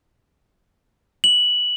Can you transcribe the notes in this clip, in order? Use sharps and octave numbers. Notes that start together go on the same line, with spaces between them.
F#7